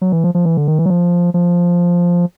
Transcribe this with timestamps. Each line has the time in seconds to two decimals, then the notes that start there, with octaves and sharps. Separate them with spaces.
0.01 F#3
0.12 E3
0.24 F3
0.35 F3
0.45 E3
0.57 D3
0.68 D#3
0.79 E3
0.86 F#3
0.90 F3
1.34 F3